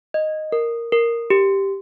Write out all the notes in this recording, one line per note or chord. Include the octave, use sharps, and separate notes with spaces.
D#5
A#4
A#4
G4